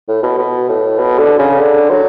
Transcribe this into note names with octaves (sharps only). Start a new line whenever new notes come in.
A2
B2
B2
A2
B2
D3
C#3
D3
F#3